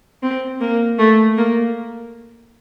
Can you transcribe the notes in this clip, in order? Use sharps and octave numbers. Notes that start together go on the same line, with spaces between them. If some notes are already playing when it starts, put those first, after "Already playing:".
C4
A#3
A3
A#3